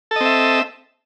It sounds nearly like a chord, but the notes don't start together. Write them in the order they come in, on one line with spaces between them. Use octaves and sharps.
A4 D#5 C4 E5